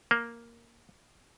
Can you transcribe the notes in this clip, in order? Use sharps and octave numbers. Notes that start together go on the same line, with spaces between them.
A#3